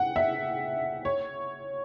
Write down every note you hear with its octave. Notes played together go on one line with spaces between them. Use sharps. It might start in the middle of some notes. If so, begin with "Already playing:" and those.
Already playing: F#5 G5
E5
C#5